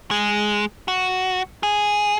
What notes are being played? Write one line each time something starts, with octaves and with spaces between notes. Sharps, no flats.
G#3
F#4
G#4